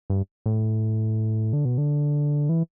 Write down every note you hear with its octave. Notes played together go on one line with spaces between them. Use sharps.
G2
A2
D3
B2
D3
E3